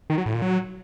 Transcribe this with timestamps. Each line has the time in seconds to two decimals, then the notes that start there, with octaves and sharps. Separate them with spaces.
0.10 D#3
0.18 F#3
0.26 A2
0.34 A#2
0.42 F#3